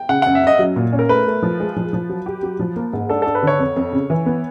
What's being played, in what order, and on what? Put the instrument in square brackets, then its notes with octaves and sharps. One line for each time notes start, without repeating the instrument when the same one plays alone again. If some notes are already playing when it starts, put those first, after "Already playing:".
Already playing: [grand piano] G5
[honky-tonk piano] C#3 [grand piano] F#5
[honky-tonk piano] F#2 [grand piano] F#5
[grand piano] E5
[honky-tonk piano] F#2 [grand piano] D#5
[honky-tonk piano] F#3
A#2
C#4
[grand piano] A#4
[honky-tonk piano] A3 [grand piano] B4
[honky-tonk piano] A3
F3
G#3
F3
F3
F#3
G4
F#3
F3
A#3
G#2
[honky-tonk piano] D4 [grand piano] A4
[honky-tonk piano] D4 [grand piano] A4
[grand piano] B4
[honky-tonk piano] D3 [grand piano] C#5
[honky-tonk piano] F2
F2
C#3
E3
B3